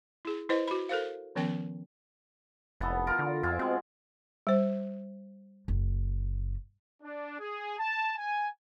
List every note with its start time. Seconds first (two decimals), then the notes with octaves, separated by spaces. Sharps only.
0.25 E4 G#4
0.49 E4 B4 C5 D#5
0.68 F#4 B5
0.89 A4 A#4 C5 F5
1.35 D#3 F3 B3 C#4 A#4 G5
2.81 F1 E3 B3 A4
3.07 F4 A#4
3.19 D3
3.43 F2 F4 G#4 E5
3.59 B2 G#3 C4
4.47 G3 C5
5.68 F#1
7.03 D4
7.40 G#4
7.79 A5
8.18 G#5